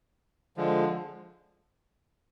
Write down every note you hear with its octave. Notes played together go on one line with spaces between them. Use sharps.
D3 F3 G#3